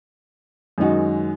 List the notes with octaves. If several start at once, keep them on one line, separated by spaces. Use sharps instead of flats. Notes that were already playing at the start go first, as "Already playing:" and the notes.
F#2 D#3 G#3 D#4 F#4